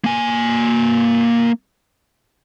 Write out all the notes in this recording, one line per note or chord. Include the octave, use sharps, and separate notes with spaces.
A#3 G#5